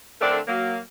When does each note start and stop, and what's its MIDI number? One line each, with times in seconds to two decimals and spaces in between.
0.21 0.38 50
0.21 0.38 57
0.21 0.38 60
0.21 0.38 62
0.21 0.38 70
0.21 0.38 74
0.47 0.78 54
0.47 0.78 58